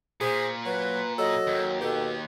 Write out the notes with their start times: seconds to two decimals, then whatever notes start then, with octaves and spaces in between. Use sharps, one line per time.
0.21 A#2 G#4 C5
0.65 F#3 B4
1.18 F#3 A4 D#5
1.47 D#2
1.81 B2 G4 A4